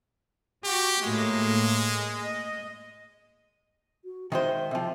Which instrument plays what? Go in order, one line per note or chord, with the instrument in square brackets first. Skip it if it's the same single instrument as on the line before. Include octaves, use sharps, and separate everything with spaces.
[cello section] F#4 [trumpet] G4
[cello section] A2 A#3 [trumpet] G#3
[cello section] D#5
[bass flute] F#4
[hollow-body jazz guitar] D#3 G#3 C5 [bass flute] E5
[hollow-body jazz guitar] C3 F3